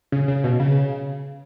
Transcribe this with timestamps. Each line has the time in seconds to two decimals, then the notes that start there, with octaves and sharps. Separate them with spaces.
0.12 C#3
0.28 C#3
0.44 B2
0.60 C#3